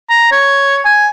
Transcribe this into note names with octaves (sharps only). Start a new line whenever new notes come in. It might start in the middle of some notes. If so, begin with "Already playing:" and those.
A#5
C#5
G#5